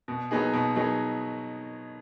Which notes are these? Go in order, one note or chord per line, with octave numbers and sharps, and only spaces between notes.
B2
F#3 B3 D#4 G#4
B2
F#3 B3 D#4 G#4